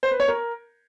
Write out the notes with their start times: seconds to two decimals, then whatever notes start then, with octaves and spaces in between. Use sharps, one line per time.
0.03 C5
0.11 B4
0.20 C#5
0.28 A#4